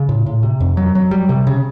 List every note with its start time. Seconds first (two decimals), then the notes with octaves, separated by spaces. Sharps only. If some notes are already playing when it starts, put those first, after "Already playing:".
Already playing: C#3
0.09 A2
0.26 A2
0.43 C3
0.60 F2
0.77 F#3
0.95 F#3
1.11 G3
1.29 C3
1.47 C#3